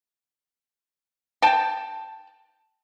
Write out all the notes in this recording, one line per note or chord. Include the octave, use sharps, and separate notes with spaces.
G5 A5